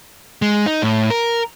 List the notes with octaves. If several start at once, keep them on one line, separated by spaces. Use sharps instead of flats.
G#3
D#4
A2
A#4